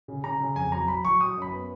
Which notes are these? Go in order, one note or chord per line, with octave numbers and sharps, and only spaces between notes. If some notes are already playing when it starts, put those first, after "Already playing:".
C#3
C#3 A#5
C#3
F2 G#5
F#3 A#5
F#3 B5
F#3 C#6
F#3 D#6
F#2
B5
B3